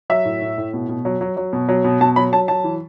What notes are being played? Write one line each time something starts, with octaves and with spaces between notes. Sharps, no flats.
F#3 E5
A2
A2
A2
B2
B2
F#3
F#3
F#3
B2
F#3
B2
B2 A5
F#3 B5
F#3 A5
F#3 A5
E3